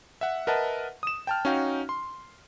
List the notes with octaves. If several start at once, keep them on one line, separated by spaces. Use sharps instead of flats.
E5 F#5
A#4 B4 D#5 E5 F#5 A5
D#6 E7
G5 A5 F6
C#4 D#4 F#4 F5 G5
C6